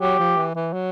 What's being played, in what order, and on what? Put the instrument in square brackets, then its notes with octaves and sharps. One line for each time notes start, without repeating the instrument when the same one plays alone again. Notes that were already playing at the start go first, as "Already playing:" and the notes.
[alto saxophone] F#3 [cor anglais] G4
[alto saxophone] F3
E3
E3
F#3